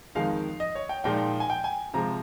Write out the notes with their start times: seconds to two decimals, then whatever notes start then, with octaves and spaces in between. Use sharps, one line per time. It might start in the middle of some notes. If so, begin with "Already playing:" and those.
0.15 F2 D#3 G#3 D#4 F5
0.60 D#5
0.75 C#5
0.89 G5
1.04 A#2 F3 G#3 D#4 G5
1.40 G#5
1.50 G5
1.64 G#5
1.94 C3 F3 G#3 A#5